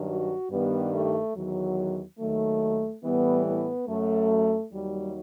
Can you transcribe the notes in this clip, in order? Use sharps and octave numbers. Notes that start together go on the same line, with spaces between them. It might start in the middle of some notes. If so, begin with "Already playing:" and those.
Already playing: G2 D#3 F#3
F#4
G2 D#3 G3 B3
A3
E2 D#3 F#3
D#2 D#3 F#3 A3
A2 E3 G3 B3
B3
F#2 F#3 A3
D#2 D#3 F#3 G3